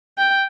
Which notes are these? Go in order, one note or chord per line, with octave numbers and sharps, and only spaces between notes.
G5